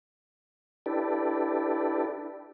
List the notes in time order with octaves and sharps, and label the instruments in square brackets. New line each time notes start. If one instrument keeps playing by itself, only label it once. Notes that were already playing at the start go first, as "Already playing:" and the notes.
[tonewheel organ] D4 E4 G4 A4 B4 D5